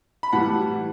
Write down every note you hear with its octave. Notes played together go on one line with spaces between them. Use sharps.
B5
A2 E3 G3 F#5 A5